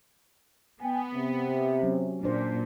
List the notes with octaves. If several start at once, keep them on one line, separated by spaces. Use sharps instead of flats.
B3 G5 G#5
C3
F#3 C#4
A#2 D4 C5